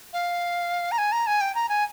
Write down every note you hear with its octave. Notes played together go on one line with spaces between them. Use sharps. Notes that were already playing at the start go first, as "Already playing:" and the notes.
F5
A#5
G#5
A#5
G#5
G5
A#5
G#5